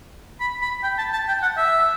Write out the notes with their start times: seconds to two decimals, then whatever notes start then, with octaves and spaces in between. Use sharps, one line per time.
0.40 B5
0.62 B5
0.83 G5
0.98 A5
1.13 A5
1.28 G5
1.42 F#5
1.57 E5